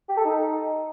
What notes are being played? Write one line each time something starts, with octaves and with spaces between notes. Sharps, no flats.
G4
A4
D#4